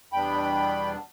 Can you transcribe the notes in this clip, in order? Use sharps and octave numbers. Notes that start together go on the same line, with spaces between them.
E2 B2 G3 B3 D4 G5 B5